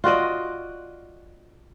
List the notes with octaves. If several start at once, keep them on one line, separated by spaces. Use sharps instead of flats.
F4 F#4 D5 D#5